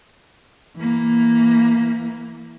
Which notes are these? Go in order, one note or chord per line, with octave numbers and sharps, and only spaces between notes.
E3 A#3